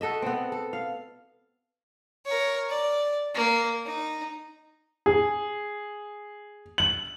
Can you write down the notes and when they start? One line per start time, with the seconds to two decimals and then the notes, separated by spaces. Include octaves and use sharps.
0.01 F#4 A4 D#5 E5
0.22 B3 C4
0.52 A4
0.73 F5
2.25 A#4 C#5
2.70 D5
3.35 A#3
3.85 D#4
5.06 G#4
6.78 F#7